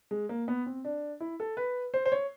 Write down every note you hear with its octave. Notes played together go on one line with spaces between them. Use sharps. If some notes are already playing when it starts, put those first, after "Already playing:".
G#3
A#3
B3
C4
D4
E4
A4
B4
C5
C5
C#5